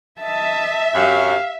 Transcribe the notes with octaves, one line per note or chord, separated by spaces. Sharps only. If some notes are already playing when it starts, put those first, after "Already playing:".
D#5 E5 A5
F#2 F#3 G4 F5